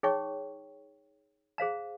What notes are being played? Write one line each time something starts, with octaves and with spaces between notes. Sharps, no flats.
D#4 G#4 C#5 G5 C#6
G#4 C5 F5 A#5